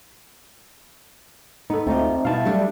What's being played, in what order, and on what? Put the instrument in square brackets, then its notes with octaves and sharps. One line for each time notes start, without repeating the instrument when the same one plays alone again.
[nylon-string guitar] B3 [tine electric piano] D#4 A4
[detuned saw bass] D2 [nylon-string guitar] A3 F4 [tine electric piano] C4 D#4
[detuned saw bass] B2 [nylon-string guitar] G3 E4 [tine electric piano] F5 A5 A6
[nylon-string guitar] F#3 A3 D4 [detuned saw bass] G3